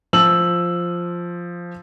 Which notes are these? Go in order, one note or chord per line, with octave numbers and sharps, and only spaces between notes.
F3 E6 F#7